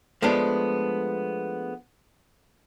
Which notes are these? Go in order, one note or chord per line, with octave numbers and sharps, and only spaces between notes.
F3 G#3 A3 B3 D4